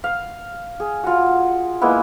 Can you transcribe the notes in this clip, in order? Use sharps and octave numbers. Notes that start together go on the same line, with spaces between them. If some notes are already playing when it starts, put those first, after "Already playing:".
F5
G#4
F4 F#4
G#3 A#3 B3 E4